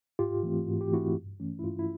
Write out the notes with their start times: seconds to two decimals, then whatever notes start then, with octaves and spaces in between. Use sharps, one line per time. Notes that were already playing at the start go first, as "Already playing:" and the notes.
0.19 G#2 F4 G4
0.43 E3 A3 C4
0.67 G#2 F#4
0.81 G4
0.91 E3 A3 C4 E4 F#4
1.15 G2
1.40 E3 A3 C#4
1.59 E4
1.64 G2 F4
1.79 E4